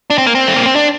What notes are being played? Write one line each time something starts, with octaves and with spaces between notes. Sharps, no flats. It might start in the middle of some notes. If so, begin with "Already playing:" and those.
D4
C4
A#3
C4
A3
A#3
C4
D4